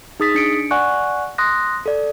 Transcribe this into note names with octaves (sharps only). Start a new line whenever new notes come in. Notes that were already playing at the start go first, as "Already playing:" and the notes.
D#4 G#4 D#6 A6 B6
D4 C#7 D7
D5 F#5 G#5 C#6 F#6
C6 D#6 F#6 A#6
A4 D5